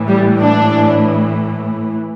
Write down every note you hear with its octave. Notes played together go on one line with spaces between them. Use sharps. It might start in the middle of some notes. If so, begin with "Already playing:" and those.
Already playing: A2 E3
G3
D4